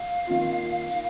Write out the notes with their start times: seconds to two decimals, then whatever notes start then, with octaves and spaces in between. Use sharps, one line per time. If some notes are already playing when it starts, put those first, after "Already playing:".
Already playing: F5
0.27 D#3 A#3 F4
0.90 F5